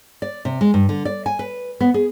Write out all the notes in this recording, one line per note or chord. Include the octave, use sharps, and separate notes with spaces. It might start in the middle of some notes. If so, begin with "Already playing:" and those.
D5
C3
G#3
G2
D3
D5
G#5
B4
B3
G#4